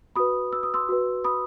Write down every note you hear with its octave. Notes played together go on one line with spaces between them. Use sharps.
F#4 B4 B5 D#6
E6
D#6
C6 E6
F#4 B4
B5 D#6